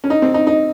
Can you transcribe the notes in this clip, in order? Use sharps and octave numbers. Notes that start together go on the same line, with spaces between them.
C#4
D#4
C4
D#4
D#4